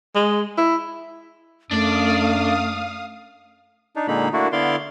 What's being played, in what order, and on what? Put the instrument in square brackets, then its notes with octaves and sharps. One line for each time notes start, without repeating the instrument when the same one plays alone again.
[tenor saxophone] G#3
E4
[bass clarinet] F#2 [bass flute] A3 [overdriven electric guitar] D4 D5 [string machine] F5 D#6
[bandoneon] D4 D#4
A#2 D3 G#3 A#3 D#4 B5
A3 A#3 D4 E4 F#4
D3 B3 E4 D5 F5 C6